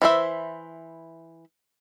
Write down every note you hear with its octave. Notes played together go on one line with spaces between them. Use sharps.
E3 E4 C5 E5